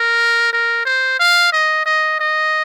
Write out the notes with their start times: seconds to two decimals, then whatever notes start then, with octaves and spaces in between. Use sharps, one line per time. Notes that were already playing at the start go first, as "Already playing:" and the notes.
Already playing: A#4
0.53 A#4
0.85 C5
1.20 F5
1.52 D#5
1.86 D#5
2.19 D#5